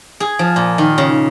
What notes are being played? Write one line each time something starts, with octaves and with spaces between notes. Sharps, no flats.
G#4
F3
A#2
D#3
C#3